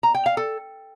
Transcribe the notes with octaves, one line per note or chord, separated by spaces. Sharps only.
A#5
G5
F5
A4